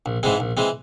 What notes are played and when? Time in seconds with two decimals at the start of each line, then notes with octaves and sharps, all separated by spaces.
0.06 A#1
0.23 G#2 E3 G#3 C4
0.40 A#1
0.57 E3 G#3 C4